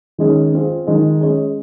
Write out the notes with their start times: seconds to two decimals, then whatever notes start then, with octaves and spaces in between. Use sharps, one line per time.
0.18 D#3 G#3 C#4 G#4 C#5
0.53 C4 F4 G#4
0.86 D#3 G#3 D#4
1.21 G#3 C#4 G#4 C#5